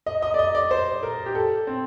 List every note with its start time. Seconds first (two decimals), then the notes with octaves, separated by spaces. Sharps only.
0.06 D#5
0.22 D#5
0.34 D5
0.39 D#5
0.55 D5
0.71 C5
1.03 A#4
1.26 G4
1.35 A4
1.67 C4